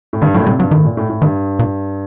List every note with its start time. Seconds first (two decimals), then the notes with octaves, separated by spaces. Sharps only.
0.13 A2
0.22 G2 D#3
0.34 A2 F#3
0.41 A#2
0.46 C3 G3
0.59 G2 F#3
0.71 A2 D#3
0.85 A#2
0.97 A2
1.10 A2
1.21 G2 D#3
1.59 A#2